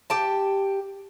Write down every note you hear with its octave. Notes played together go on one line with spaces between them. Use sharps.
G4 G5 A5